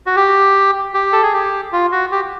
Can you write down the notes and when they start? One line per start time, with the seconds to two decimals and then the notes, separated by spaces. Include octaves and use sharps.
0.07 F#4
0.16 G4
0.94 G4
1.13 A4
1.23 G#4
1.34 G4
1.73 F4
1.92 F#4
2.12 G4